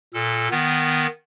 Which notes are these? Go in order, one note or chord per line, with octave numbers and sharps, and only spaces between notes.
A#2 A4
D#3 B3